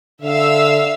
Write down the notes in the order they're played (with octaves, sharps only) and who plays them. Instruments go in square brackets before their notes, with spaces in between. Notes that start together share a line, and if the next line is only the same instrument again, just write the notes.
[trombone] D3 [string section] E5 F5 E6